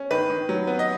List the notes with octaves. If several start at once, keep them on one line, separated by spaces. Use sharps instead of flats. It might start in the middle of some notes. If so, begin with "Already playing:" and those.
Already playing: C#4
D#3 B4
D#3
F#3
B3
D#5